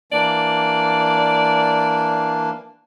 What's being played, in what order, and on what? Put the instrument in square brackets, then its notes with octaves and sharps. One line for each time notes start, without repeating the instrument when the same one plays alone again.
[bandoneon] E3 A#3 D4 [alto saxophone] D5